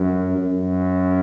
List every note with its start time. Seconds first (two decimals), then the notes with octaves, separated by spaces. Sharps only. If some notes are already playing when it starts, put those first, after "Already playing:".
Already playing: F#2
0.37 F#2